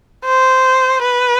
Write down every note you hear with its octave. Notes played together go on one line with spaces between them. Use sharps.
C5
B4